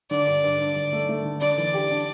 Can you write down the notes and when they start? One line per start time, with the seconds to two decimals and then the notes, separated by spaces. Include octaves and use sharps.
0.10 D3 D5
0.27 G2
0.44 G2
0.60 G2
0.76 D3
0.92 A3
1.09 A3
1.25 D3
1.41 D4 D5
1.58 E3
1.74 G4
1.90 D4